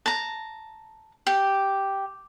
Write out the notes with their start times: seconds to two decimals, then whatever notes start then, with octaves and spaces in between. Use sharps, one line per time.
0.06 A5 A#5
1.27 G4